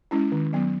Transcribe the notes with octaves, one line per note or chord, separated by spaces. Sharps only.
G#3 C#4 E4
D#3
F#3 B3